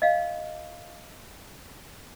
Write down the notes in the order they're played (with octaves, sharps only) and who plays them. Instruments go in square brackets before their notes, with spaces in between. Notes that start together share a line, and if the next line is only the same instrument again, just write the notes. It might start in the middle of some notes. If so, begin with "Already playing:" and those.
[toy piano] D#5 F5